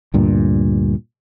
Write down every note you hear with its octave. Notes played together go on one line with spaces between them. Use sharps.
D2 G2 A#2